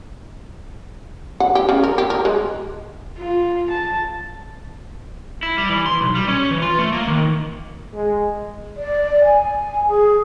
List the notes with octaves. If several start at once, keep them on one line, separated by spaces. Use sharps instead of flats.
F#5
G4
C#3
A#4
G4
A#4
G#3
F4
A5
E4
G3
E3
C6
B1
G3
C#4
E3
F4
A3
A#3
D#3
G#3
D5
G#5
G#4